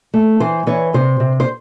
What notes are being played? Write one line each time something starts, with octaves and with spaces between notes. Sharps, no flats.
A3
E3 C5
E3 C#5
C3 C5
C3
C5